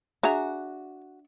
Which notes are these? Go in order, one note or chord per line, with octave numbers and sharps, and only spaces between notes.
D4 F#4 G#4 E5 G#5 A#5